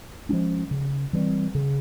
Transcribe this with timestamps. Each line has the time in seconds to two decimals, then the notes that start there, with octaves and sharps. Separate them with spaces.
0.29 F3 G#3 C#4
0.71 C#3
1.13 E3 G3 C4
1.55 C#3